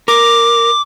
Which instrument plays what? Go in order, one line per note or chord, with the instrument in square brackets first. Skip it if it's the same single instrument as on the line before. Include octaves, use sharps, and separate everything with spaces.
[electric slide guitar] A#4 [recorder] D6